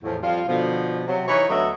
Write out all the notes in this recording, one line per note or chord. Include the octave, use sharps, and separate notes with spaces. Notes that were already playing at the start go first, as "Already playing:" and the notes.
E2 A2 F3
F2 F3 G3 F4
B2 D3 F3
C3 F#3
E3 D#4 E4 C#5
D2 F#3 B3 A4 D#5 E5